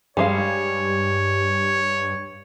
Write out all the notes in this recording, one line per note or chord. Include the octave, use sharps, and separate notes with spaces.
G2 G3 G#3 C#5 F5